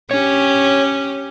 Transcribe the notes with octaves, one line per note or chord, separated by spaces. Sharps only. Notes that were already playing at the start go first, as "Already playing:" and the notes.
C#4 G4 C#5